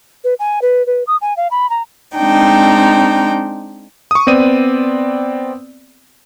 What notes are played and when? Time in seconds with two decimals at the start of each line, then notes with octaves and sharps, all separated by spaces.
0.24 B4
0.39 G#5
0.62 B4
0.86 B4
1.07 D#6
1.21 G#5
1.37 F5
1.51 B5
1.70 A#5
2.17 G#3 C4 D4 D#4 G5
4.11 C#6 D#6
4.27 B3 C4 D5 D#7